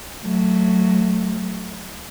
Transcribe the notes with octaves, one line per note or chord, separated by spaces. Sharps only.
F#3 A3